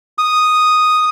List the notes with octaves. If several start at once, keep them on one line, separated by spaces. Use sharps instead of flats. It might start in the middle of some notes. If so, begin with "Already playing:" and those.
D#6